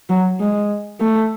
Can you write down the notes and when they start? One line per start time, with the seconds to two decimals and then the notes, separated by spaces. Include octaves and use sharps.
0.10 F#3
0.40 G#3
1.00 A3